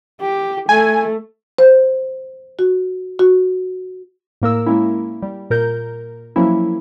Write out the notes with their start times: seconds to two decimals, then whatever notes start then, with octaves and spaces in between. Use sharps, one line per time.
0.20 G4
0.69 A3 G#5
1.59 C5
2.59 F#4
3.19 F#4
4.42 A2 A#3 A#4 E6
4.66 G#3 A#3 C#4 E4
5.22 G3
5.50 A#2 A#4 G6
6.36 F3 F#3 A#3 C#4 E4